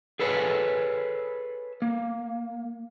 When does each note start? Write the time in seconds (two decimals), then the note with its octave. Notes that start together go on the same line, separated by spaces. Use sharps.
0.20 G#4 A4 B4 C#5 G5 G#5
1.82 A#3